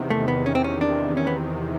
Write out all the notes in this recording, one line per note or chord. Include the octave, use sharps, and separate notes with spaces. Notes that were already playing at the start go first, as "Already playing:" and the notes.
Already playing: E2 C3 D#3
A3
B3
C#4
C4
C#4
D4
C#4
B3